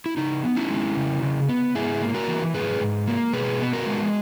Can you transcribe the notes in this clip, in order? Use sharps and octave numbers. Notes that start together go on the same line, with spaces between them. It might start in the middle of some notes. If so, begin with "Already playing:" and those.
E4
C#3 D#4
B3
C#4 E4
G#3
C#3
C#3
B3
G#2 E4 G#4
A#3
F#4 A#4
E3
G#2 G#4 B4
G#2
A#3
B2 G#4 B4
B3
F#4 A#4
G#3